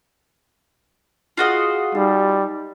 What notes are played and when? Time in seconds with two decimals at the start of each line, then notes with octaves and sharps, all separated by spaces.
1.37 F4 F#4 G#4 D#5 F#6 C7
1.95 G3 D#4